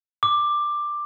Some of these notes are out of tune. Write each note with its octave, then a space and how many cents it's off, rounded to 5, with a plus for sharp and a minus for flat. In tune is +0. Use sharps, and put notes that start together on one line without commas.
D6 +10